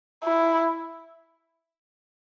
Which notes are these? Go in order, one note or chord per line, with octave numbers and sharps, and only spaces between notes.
E4